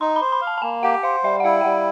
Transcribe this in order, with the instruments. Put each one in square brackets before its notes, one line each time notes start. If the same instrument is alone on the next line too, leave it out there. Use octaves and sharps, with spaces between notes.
[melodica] D#4 [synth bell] C6
[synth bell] B5
[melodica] C5
[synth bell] B5
[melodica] F5
[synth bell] A5
A5
[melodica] A#3 [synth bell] G#5
[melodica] G4 [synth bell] F#5
[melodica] C5 [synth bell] F5
[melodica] G3 [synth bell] E5
[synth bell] F#5
[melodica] E4 [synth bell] F5
[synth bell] G5
[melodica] G3 [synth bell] F#5